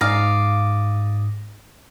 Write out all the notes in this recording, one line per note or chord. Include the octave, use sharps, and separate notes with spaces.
G#2 D5 F5 D#6 A#6